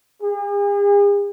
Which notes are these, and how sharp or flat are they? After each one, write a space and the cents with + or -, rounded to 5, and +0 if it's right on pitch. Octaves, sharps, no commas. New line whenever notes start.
G#4 -45